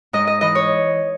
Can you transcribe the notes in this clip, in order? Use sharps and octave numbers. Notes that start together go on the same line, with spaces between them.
G#2 D#5
D#5
E3 D#5
C#5